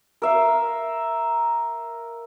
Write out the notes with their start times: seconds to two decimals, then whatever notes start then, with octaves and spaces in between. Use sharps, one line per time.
0.22 A#4 E5 F5